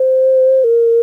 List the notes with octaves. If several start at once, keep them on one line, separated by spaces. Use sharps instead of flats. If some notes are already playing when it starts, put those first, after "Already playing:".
Already playing: C5
A#4